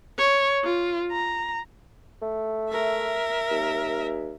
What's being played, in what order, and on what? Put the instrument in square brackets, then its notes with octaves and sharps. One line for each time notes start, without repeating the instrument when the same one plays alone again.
[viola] C#5
F4
A#5
[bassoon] A3
[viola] A#4 E5
[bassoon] D#2